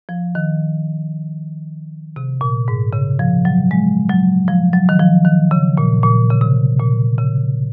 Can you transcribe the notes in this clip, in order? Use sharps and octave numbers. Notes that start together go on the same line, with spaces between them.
F3
D#3
C3
A#2
G#2
C#3
F3
F#3
G#3
F#3
F3
F#3
D#3
F3
D#3
C#3
A#2
A#2
C#3
C3
A#2
C#3